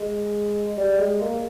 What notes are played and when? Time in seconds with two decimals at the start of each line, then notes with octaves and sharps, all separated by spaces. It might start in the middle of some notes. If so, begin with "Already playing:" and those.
Already playing: G#3
0.77 G3
0.99 G#3
1.21 A#3